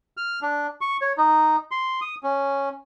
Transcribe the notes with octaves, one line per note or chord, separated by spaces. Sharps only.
F6
D4
C#6
C#5
D#4
C6
D#6
C#4